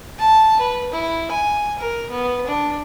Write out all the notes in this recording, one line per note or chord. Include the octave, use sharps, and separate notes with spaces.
A5
B4
E4
G#5
A#4
B3
D4